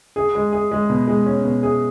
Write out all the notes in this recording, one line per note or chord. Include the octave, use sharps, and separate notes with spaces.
G#4
G#3
G#4
G#3
B2
G#3
C#4
B2
G#4